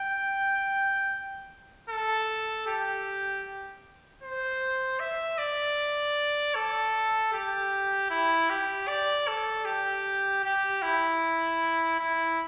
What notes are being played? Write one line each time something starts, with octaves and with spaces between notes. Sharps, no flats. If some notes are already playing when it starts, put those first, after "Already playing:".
Already playing: G5
A4
G4
C5
E5
D5
A4
G4
E4
G4
D5
A4
G4
G4
E4
E4